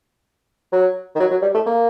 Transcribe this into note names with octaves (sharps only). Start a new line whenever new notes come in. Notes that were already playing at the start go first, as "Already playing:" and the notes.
F#3
D#3
F#3
F#3
G3
A3
A#3